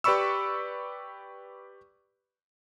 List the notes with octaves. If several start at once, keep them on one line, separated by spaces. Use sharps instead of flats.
G4 B4 D5 B5 C#6 E6